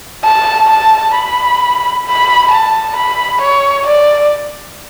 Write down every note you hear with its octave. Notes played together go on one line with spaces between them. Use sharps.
A5
A5
B5
B5
A5
B5
C#5
D5